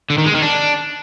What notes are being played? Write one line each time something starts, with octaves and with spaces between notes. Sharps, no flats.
D3
D#3
G#3
D#3
D4